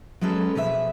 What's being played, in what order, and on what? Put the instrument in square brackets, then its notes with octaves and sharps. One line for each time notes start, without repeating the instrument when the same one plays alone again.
[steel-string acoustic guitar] F#3 G#3 C#4 A4 B4
B2 F3 G#4 B4 C#5 E5